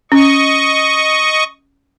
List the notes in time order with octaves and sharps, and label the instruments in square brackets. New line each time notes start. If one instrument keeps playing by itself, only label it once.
[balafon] C#4 [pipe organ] D#5 C#6